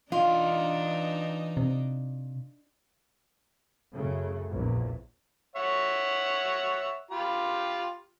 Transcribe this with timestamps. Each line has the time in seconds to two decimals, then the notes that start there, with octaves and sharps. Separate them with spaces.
0.12 E3 D4 D#4 F4 D#5
1.57 C3
3.93 F#2 C#3 A3
4.50 A#1 E2
5.56 C#5 E5 F#5
7.11 F4 G4 B5